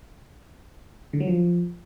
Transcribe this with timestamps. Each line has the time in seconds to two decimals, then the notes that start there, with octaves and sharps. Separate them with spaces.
1.13 D3
1.20 F#3
1.28 F3